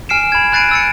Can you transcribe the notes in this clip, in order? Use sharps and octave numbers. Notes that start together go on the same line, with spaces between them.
G#5 F6 C7 D7 E7
B5 G#6
B5 F#6 A6 C7 D7 D#7
E6 A6 C#7